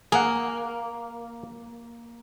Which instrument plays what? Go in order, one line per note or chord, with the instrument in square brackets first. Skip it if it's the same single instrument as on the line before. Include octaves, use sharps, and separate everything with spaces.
[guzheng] A#3 [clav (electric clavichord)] G#4 F#5